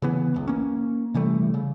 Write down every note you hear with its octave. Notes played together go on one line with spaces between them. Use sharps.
C#3 E3 B3
F#1 C#2
A#3 C#4
C3 E3 G3 A3
C#3